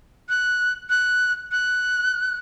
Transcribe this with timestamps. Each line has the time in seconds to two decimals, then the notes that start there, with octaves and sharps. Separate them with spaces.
0.29 F#6
0.90 F#6
1.51 F#6